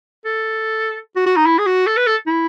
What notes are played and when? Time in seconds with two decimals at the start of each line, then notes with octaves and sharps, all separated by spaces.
0.25 A4
1.16 F#4
1.26 F#4
1.36 D#4
1.46 E4
1.59 G#4
1.66 F#4
1.87 A4
1.97 B4
2.07 A4
2.27 E4